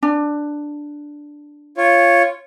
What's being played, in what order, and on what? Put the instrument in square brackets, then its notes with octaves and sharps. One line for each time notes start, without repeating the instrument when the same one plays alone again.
[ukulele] D4
[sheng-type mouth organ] F4 C#5